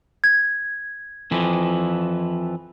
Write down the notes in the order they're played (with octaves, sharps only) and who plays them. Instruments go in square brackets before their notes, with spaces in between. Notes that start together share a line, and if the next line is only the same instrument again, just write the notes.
[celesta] G#6
[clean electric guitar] F2 E3 F3